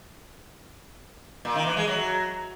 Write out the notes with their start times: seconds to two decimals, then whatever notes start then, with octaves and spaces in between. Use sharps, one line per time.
1.45 A#2
1.56 D#3
1.66 E3
1.77 G#3
1.87 F#3